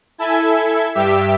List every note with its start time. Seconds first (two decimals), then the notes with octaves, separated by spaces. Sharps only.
0.18 E4 A4 E5 G#5 G#6
0.95 G2 G4 E5